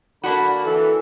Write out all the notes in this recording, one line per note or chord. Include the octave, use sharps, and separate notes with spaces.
D3 A#3 D4 F#4 B5
E3 A4